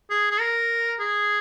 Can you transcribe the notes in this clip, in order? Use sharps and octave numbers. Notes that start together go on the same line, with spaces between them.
G#4
G#4
A#4
G#4